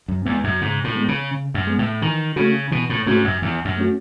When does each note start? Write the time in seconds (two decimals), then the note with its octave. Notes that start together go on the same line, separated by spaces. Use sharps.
0.08 F#2
0.25 E2 G#3 B3
0.44 F#2
0.61 G#2 C#3
0.84 A2
0.95 G#3 B3
1.08 C#3
1.32 C#3
1.54 F#2
1.67 G#3 B3
1.79 A2
2.02 D#3 E3
2.36 C#3 A3 C#4 F#4
2.71 B2 E3
2.90 A2
3.06 G#2 A3 C#4 F#4
3.24 F#2
3.42 E2 E3
3.65 F#2
3.78 A3 C#4 F#4